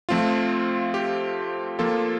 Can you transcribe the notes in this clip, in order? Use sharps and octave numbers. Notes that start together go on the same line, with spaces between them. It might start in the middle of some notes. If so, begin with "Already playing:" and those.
F3 A3 C4 F4
G4
F3 A#3 F4 A4